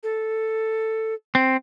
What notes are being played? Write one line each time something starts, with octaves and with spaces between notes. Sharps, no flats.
A4
C4